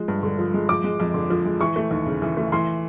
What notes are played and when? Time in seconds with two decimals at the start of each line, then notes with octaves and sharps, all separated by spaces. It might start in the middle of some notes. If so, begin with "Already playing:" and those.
Already playing: F3 G#3
0.08 G2
0.23 D3
0.39 F3
0.54 G#3
0.69 F3 D6
0.84 G#3
1.00 F2
1.14 D3
1.30 F3
1.45 G#3
1.60 E3 C#6
1.76 A3
1.91 D#2
2.06 C#3
2.22 E3
2.37 A3
2.52 E3 C6